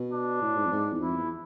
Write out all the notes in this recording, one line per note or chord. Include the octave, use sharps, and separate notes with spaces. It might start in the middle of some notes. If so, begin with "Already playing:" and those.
Already playing: B2
D4
A2
G#2
F2
G#2
E2
F2 E4
E2